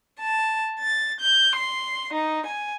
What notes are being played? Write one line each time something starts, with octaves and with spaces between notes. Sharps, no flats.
A5
A6
G6
C6
D#4
G#5